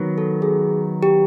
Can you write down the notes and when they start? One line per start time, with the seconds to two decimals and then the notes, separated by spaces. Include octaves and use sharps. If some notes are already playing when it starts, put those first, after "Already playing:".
Already playing: D#3 F#3 B3
0.18 A4
0.42 G#4
1.03 G4